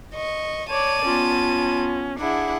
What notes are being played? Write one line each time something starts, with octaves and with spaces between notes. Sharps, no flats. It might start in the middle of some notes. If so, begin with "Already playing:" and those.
D#5 C#6
C#5 D5 A5 D#7
B3 C#4 F4
D4 E4 G#4 F#5